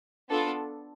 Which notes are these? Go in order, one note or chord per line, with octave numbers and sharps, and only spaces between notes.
B3 D4 F4 A4